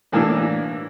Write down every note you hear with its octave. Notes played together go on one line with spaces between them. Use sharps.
A2 E3 A#3 D4 E6